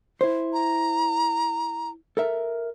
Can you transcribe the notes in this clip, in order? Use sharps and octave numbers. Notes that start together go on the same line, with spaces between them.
E4 C5
A#5
A4 A#4 E5